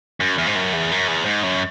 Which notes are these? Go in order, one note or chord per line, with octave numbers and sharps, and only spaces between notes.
F#2
E2
G#2
F#2
E2
F#2
E2
G#2
F#2